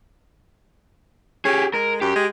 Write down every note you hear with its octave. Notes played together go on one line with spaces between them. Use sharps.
C#4 G4 G#4
G#3 A#4
F#2 G4
G#3